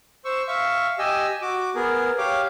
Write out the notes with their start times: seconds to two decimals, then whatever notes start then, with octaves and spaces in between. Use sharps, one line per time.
0.25 C5 C#6 E6
0.48 E5 F5 C#6
0.99 G4 D#5 G#5 E6
1.42 F#4 D6
1.75 B3 G#4 A#4
2.18 G4 C#5 F5 D6